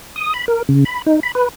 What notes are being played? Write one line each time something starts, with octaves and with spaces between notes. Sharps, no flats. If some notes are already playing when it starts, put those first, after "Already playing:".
D#6
B5
A#4
C#3
B5
D#4
B5
B4